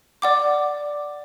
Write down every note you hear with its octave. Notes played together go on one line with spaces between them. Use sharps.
D5 F#5 D6